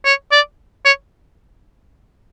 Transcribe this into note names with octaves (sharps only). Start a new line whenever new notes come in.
C#5
D5
C#5